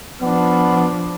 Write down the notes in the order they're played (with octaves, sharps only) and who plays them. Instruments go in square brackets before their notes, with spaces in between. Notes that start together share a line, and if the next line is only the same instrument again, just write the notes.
[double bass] F3 D4 [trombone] B3